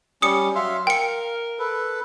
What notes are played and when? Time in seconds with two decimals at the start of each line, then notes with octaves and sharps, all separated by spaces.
0.22 G3 C#4 G4 D#6 C#7
0.55 F#3 E5 F5 C6
0.87 A#4 F5 G5 C#7
1.59 A4 B4